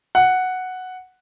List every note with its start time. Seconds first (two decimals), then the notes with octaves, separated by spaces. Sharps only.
0.15 F#5